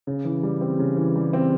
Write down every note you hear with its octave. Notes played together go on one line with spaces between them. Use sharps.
C#3
E3
G3
C4
C#3
E3
G3
C4